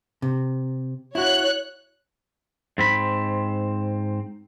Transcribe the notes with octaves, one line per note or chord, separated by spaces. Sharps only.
C3
E4 F#4 C#5 F#6
G#2 C4 B5